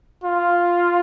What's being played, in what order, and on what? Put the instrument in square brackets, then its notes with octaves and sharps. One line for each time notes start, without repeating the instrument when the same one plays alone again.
[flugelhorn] F4